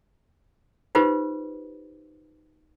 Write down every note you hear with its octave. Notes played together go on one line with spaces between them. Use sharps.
D#4 F4 G4 B4 C5